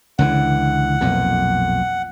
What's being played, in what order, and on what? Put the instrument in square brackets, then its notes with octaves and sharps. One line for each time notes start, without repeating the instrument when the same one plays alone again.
[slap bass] C#2 D3 E3 [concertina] F#5
[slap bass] B1 F2 A#2